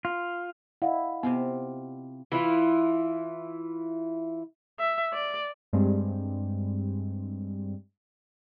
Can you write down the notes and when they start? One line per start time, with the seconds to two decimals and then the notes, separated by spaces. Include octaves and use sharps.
0.05 F4
0.82 E4 D#5 F5 F#5
1.23 C3 B3 C4 F4
2.32 E3 E4 F4
4.80 E5
5.14 D5
5.73 G2 G3 G#3 C4